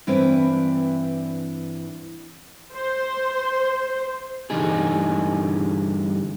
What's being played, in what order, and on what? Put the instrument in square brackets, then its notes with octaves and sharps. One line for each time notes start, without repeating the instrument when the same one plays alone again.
[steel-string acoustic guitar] G2 E3 C4 D4 E4 B4
[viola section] C5
[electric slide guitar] G2 D3 E3 G3 D#4 G#4